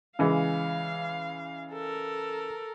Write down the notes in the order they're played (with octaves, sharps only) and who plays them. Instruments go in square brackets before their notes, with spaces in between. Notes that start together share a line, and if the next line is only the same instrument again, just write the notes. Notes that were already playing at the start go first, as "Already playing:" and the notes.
[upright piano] C#3 E3 G#3 [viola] F5
[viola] A4 A#4